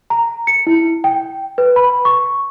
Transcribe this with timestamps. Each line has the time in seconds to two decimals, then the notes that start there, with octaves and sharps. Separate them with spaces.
0.10 A#5
0.47 C#7
0.67 E4
1.04 G5
1.58 B4
1.76 B5
2.05 C#6